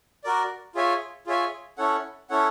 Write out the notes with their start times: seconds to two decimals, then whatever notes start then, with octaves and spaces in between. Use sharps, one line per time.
0.24 F#4 A#4 D5
0.75 F4 G#4 C#5 E5 G#5
1.27 F4 G#4 C#5 E5 G#5
1.78 C#4 E4 A4 C#5 F#5
2.30 C#4 E4 A4 C#5 F#5